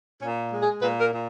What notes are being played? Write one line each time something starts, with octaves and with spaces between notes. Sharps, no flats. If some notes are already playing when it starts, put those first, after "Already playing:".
A#2 C#4
G#3
G#4
A#2 B4
A#4
A#2